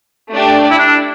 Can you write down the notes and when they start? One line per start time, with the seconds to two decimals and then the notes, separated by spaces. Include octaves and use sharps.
0.33 A3 D4 G4 D5
0.71 E4
0.79 D4